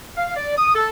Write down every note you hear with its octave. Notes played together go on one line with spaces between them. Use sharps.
F5
D5
D#6
A4